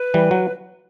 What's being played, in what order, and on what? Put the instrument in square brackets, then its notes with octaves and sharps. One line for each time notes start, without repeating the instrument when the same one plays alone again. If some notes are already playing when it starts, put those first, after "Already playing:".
Already playing: [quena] B4
[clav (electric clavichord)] E3 G3
F#3